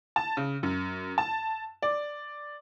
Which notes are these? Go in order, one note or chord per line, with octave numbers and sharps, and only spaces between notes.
A5
C#3
F#2
A5
D5